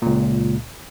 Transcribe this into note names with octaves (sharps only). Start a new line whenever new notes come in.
C#2 A#2